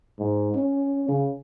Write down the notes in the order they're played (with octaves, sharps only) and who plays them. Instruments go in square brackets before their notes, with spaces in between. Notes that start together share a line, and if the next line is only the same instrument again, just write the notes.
[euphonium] G#2
C#4
C#3